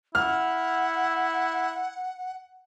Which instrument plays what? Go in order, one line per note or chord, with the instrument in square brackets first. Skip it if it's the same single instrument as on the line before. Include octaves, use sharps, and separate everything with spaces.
[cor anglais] E4 [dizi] F#5 [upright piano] F6